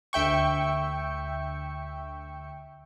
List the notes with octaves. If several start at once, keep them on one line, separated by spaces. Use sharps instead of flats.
D2 E5 G5 C#6